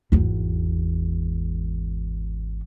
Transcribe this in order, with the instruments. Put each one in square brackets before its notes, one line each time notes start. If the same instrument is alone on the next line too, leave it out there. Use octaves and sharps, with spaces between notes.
[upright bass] G#1 E2